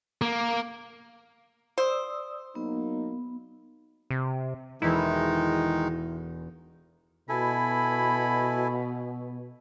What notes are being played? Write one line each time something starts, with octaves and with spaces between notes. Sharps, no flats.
A#3
C5 D5 D#6 E6
F#3 A#3 B3 D#4
C3
E1 E2 D#3 G#3 D#4 E4 A4
B2 E4 A4 G#5 B5